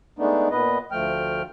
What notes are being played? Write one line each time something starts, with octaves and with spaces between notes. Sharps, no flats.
G#3 A3 B3 D4 D#4
A#2 B3 B4 D#5
D2 F3 A3 G5 F6